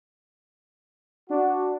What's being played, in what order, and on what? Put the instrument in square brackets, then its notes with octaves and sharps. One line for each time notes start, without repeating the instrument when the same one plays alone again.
[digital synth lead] D4 [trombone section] F#4